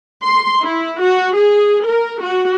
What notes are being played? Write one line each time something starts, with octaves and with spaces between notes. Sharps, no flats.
C6
E4
F#4
G#4
A#4
F#4